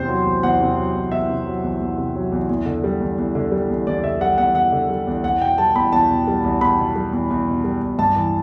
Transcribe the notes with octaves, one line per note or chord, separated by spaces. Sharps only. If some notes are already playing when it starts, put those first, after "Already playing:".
Already playing: E2 C3 C5
F#3
E2
E2 F#5
C3
F#3
E2
E2 E5
C3
F#3
E2
E2
C3
F#3
E2
E2
D3
G3
E2
E2
D3
G3
E2
E2 D5
D3 E5
G3 F#5
E2 F#5
E2 F#5
D3
G3
E2
E2 F#5
B2 G5
G3 A5
E2 B5
E2 A5
B2
G3
E2
E2 B5
B2
G3
E2
E2
B2
G3
E2
G2 A5
E3